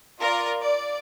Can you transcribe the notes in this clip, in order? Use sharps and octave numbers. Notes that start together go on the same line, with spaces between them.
F4 A#4 D5
D5